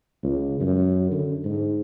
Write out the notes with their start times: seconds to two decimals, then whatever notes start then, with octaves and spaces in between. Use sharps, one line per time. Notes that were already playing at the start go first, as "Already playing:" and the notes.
0.23 C#2
0.60 F#2
1.11 D3
1.45 G#2